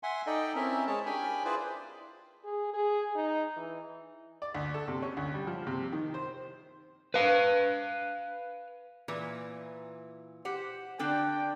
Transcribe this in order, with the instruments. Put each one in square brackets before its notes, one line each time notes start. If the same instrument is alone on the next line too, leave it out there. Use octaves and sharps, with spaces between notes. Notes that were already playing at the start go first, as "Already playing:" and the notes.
[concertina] E5 F#5 G#5 C6
D#4 A4 D5 D#5 G5
C4 C#4 E4 A#4 E5
G#3 G#4 C#5 A5
D4 G4 A#4 G5 G#5 B5
E4 F4 G#4 B4 C5 D5
[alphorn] G#4
G#4
D#4
E3
[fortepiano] D5
D2
A4
C3
C#4
D2
G3
F3
C3
D#3
C5
[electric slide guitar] B4 F5
[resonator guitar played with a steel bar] A#2 E3 B4
G4 C5 F#5
[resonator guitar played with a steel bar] D3 D4 A4 [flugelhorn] G5